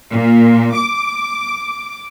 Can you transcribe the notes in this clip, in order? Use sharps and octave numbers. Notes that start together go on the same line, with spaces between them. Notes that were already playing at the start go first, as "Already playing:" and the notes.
A#2
D6